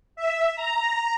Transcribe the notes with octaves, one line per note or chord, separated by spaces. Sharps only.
E5
A#5